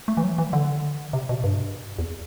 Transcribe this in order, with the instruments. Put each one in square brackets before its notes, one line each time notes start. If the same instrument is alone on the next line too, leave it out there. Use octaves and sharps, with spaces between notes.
[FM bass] A3
E3
F#3
E3
D3
C3
B2
G2
E2